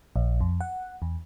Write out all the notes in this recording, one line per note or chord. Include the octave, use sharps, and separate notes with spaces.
A#1
F2
F#5
E2